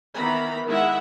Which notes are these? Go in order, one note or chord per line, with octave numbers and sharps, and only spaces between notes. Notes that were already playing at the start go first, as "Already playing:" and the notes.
D#3 E3 B3 A#5 B5
D#3 G#3 E4 E5 F#5